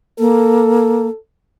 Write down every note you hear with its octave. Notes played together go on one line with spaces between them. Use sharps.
A#3 A4